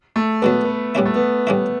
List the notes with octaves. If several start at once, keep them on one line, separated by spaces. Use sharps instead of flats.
A3
C#2 B2 F#3 B3
B3
A2 G3 B3 C#4 E4
A3
B3
A2 G3 C#4 E4